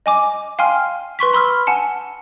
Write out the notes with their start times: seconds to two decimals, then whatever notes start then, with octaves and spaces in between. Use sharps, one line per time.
0.06 D#5 G#5 D6
0.59 F5 G5 G#5 C6 F6
1.19 B4 C6 C#6 B6
1.33 B5 C6 E6 F6
1.67 F#5 G#5 A5 C#7